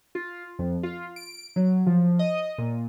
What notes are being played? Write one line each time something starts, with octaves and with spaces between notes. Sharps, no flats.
F4
F2
F4
D7
F#3
F3
D#5
A#2